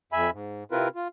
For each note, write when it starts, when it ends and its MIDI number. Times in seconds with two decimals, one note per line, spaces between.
0.13 0.30 41
0.13 0.30 76
0.13 0.30 80
0.13 0.30 83
0.33 0.64 44
0.72 0.88 48
0.72 0.88 60
0.72 0.88 64
0.72 0.88 65
0.72 0.88 70
0.72 0.88 71
0.95 1.08 65